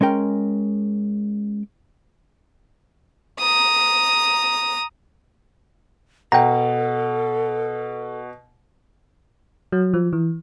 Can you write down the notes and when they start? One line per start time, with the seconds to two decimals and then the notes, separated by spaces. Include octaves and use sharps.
0.01 G#3 C#4 A#4 G5
3.40 A#5 D#6
6.32 B2 A4 F#5 G5 A#5
9.72 F#3
9.94 F3
10.13 E3